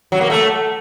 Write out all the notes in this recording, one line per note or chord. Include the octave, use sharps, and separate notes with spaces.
F#3
A#3
A3